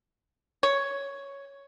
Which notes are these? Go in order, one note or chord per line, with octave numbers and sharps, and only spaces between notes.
C#5